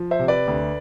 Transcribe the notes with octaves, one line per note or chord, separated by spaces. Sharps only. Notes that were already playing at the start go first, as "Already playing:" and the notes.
Already playing: F3
C5 E5
C3
B4 D5
D2